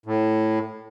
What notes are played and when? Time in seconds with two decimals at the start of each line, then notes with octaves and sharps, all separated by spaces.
0.06 A2